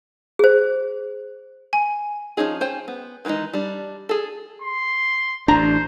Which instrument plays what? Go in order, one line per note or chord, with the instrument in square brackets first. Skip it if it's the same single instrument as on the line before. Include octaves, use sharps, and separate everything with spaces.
[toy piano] G#4 C5
[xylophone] G#5
[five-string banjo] F3 G3 C#4 D#4 G#4
C#4 C5 G5 G#5
B3
D#3 E3 G3 G#3 D#4
G3 D4
G#4 A4
[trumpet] C6
[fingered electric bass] A1 D4 [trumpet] C5 [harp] A#5